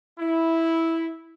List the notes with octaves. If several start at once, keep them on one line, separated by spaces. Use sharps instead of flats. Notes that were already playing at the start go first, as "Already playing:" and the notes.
E4